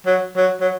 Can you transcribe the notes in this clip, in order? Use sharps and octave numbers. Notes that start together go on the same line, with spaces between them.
F#3
F#3
F#3